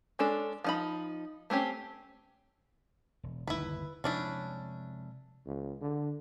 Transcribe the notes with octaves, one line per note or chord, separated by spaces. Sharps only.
G#3 C#4 D4 A4
F3 D#4 B5
A3 C4 C#4 G4
E1
G1 D#2 C#3 E4 B4
C3 F3 G#3 C#4 D4 E4
C#2
D3